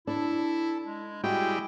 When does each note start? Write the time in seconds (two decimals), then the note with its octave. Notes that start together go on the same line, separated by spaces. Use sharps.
0.07 D4 E4 A4
0.84 G#3
1.24 G3 G#3 E4 F#4 G5